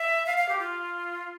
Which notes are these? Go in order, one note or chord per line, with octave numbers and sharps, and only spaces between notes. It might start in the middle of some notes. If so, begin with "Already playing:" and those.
Already playing: E5
F5
F5
G4
F4